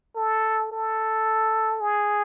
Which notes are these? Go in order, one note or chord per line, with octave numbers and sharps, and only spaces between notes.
A4
A4
G#4